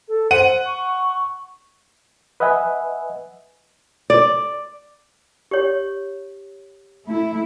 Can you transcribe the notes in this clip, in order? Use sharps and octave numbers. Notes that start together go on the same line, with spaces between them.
A4
C5 F#5 D#7
C#6
B4 D#5 E5 F#5 G#5
D5
G4 C#5
A3 E4